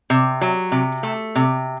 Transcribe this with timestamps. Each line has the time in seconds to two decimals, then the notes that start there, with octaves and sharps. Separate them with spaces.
0.10 C3
0.41 F#3
0.72 C3
1.03 A3
1.35 C3